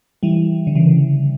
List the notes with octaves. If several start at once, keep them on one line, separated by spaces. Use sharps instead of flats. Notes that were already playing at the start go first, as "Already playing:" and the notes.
E3 G3
D3
C#3 E3